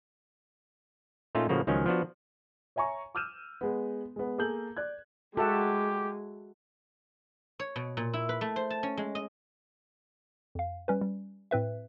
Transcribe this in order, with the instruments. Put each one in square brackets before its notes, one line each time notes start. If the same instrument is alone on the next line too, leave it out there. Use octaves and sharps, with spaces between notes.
[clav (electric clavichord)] A#2 A3 C#4 D#4 F4
A2 C#3 F3 A#3 F#4
C#2 D#3 F3 F#3 C#4
F3 B3 D4 F#4
[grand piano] C#5 E5 G#5 A#5 C#6
D6 E6 F6 G6 D#7 E7
G#3 B3
G#3 B3
A#3 G#4 A4 G6 F#7
D5 F#6 G#6
[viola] G#3 [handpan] F#4 E5 F#5 [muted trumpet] G4 [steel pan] A4
[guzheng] C#5
B2
A#2
E4
B4
A3
C5
A5
C#4
G#3
D#5
[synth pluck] F2 F5
G3 C#4 B4
G3
A2 C4 B4 E5